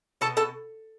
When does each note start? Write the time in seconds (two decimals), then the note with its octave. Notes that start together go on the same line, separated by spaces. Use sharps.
0.21 B2 A4 A5
0.37 A4 A5